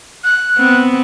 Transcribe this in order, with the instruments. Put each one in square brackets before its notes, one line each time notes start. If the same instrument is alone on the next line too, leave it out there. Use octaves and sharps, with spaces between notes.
[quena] F#6
[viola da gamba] B3 C4